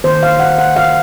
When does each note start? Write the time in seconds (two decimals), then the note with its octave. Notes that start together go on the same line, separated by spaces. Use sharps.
0.04 D#3 A#3 C5
0.23 F5
0.40 F#5
0.59 F#5
0.77 F5